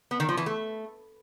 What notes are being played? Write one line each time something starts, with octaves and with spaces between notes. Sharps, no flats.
B3
D#3
F3
E3
A3